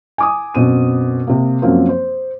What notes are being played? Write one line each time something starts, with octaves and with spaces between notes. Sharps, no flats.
G#5 D6 D#6
F#2 B2 C4 D#7
C3 A#3
F#2 F3 F#3 A#3 C4
C5